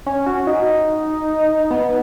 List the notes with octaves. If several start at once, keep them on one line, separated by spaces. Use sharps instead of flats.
C#4
F#4
D#4
B3